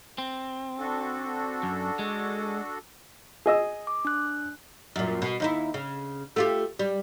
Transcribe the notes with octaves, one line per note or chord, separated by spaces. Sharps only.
C4
D4 F#4 A4
F#2
G#3
G#4 D#5 E6
D6
D4 F#6
F#2 A#2
B2
D#2 D#4 E4
C#3
A3 F4 G4
G3